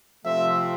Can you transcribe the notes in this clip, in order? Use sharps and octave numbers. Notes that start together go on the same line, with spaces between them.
C3 F3 A3 C4 E5